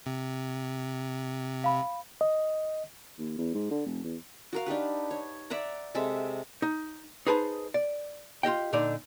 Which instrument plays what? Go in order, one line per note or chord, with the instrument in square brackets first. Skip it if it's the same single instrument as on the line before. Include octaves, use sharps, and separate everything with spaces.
[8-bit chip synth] C3
[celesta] F5 B5
[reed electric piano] D#5
[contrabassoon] D#2
E2
G#2
D3
F1
E2
[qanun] F#4 A#4 F5
D4 D#4 G4 B4
C#5
D5 E5 F#5 A#5
C3 G#3 A4 E5
[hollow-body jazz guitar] D#4
D#4 G#4 B4 C5 G5 A5
D5
F4 G4 D#5 G5
A#2 D3 D4 D#4 D5